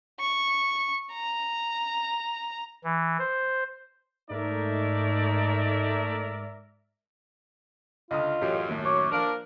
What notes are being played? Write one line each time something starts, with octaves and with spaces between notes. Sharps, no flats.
C#6
A#5
E3
C5
G#2 A3 D#4 A#4 D5 E5
C#2 D3 F4 D#5 D#6
A1 F#2 G4
D#2 A2
C#5 D6
F3 A#3 D4 F4 A#4